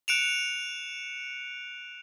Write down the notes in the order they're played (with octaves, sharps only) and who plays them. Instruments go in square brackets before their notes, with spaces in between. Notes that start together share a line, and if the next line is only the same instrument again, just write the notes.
[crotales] F#6 C#7 D7 E7 F7